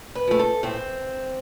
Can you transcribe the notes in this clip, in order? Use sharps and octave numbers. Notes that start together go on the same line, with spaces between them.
B4
F3 A3
A4
A2 C4